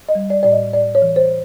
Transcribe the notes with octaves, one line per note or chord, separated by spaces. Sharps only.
D#5
G3
D5
A2 D5
D#5
A2 D5
C#5
E3
C5